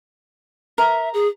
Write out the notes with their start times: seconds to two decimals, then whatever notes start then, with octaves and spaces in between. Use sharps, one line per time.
0.78 A#4 E5
1.14 G#4